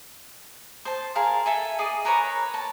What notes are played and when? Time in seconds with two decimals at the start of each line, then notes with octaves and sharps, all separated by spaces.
0.85 C5 A5
1.15 G#4 A#4 F5 A5
1.46 A4 E5 G#5
1.79 G#4 D#5 D6
2.05 A#4 B4 C#5 A#5
2.54 A5